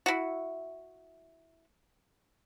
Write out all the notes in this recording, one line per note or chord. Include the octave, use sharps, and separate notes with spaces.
E4 F#4